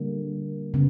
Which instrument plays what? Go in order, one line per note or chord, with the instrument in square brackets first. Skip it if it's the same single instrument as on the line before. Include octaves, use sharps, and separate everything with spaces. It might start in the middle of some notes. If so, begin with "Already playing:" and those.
Already playing: [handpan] D3 G3 A#3
C#3 B3